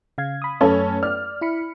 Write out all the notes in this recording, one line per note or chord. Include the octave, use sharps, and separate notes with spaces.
C#3 F5 G#6
B5 D#6
F#2 A3 C#4 A4 B4 C#5
D5 F6
E4 B5 C#7